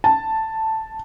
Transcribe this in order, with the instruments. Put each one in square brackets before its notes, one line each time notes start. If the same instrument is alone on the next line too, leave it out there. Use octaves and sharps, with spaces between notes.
[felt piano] A5